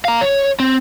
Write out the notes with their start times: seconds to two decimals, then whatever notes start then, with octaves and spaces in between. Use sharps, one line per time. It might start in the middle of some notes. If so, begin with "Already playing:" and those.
0.05 F5 A#5
0.21 C#5
0.60 C4